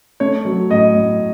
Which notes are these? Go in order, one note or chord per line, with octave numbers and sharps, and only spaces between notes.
A3 C#5
F#3
A2 D#5
A2